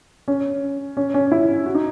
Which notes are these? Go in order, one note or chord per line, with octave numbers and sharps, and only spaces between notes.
C#4
C#4
C#4
E4
F#4
D#4